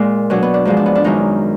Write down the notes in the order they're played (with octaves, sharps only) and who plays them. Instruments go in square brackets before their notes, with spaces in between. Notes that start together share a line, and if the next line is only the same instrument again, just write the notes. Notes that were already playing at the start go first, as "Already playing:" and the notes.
Already playing: [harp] A#2 G#3
B2 F#3 D4
B3
D4
G#2 F3 G#3 B3
D4
B3
D4
F#2 D#3 G#3 D#4